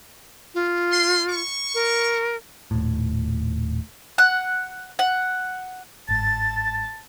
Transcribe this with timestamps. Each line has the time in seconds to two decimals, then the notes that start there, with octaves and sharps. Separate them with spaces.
0.54 F4
0.92 G#4 C6
1.30 C#6
1.74 A#4
2.71 D#1 A2
4.18 F#5 F#6
4.99 F#5
6.09 G1 G#2 A5 A6